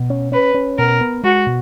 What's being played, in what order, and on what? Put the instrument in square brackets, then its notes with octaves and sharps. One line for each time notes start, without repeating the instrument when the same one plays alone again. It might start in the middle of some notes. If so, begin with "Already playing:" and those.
Already playing: [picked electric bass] B2
C#4
[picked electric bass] C#4 [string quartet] B4
[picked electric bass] C#4
[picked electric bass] B2 [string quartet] A#4
[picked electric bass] B3
[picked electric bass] G#3 [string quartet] F#4
[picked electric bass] B2